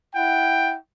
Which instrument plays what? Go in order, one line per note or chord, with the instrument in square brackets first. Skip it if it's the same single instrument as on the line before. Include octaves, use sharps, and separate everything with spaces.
[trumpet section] E4 F#5 G5